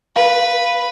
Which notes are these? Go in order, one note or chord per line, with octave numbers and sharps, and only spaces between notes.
B4 F5